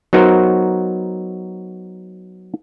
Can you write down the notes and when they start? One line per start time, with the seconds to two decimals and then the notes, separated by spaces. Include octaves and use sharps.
0.13 F#3 B3 D#4 F#4 A#4 C5